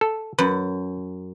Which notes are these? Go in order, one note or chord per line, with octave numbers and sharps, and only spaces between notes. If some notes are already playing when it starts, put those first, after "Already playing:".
A4
F#2 B4